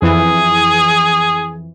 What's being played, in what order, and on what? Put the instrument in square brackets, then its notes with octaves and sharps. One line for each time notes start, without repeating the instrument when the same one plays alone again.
[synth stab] F2 E3 [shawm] G#4